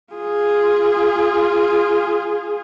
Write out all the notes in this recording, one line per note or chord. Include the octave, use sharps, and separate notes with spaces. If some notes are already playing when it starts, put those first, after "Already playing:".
F4 G#4